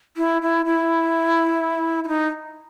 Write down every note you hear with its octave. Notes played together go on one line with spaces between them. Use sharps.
E4
E4
E4
E4
D#4